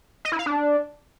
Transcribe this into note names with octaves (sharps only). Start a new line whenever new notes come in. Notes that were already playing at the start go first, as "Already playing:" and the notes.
D#5
E4
F5
D4